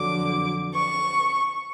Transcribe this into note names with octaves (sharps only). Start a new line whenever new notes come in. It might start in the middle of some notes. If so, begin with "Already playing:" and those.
Already playing: F2 D3 F#3 D6
C#6